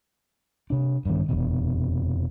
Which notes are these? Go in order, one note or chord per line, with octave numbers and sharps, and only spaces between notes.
C3 D4
G2 D#3
F1 B2